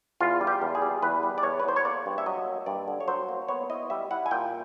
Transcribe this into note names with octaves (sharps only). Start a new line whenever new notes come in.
E2 F4
G3
G4
E2
G#4
G3
E2 B4
G3
D5
E2 C#5
B4
E2 C5
C#5
A#3 D5
G2
E5
F#3 D#5
A#3
G2 D5
D3
C#5
F#3 C5
A#3
B3 C#5
E4 D#5
G3 E5
E4 F#5
G#5
A#2 G5